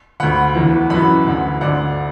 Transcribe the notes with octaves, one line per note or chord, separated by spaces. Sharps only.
D2 D3 F#5 B5
E2 E3
F#2 E3 F#5 B5
D2 D3
D2 D3 D5 F#5